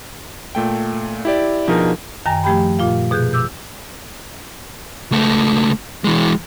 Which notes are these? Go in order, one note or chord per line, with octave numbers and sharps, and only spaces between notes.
A#2 A3 G5
E4 G4 D5
B2 F3 D4 D#4 G#4 A#4
F#2 D#3 G5 G#5 A#5 A#6
F3 A3 G4 G5 B5
A#2 F4 F5
B2 G#4 F#6 G6
D6 E6 G6
C#2 A3
E3 G#3